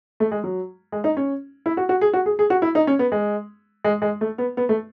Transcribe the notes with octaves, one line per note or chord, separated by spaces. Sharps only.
A3
G#3
F#3
G#3
D#4
C#4
E4
F#4
F#4
G#4
F#4
G#4
G#4
F#4
E4
D#4
C#4
B3
G#3
G#3
G#3
A3
B3
B3
A3